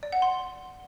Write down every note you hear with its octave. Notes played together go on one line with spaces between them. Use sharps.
D5
F#5
C6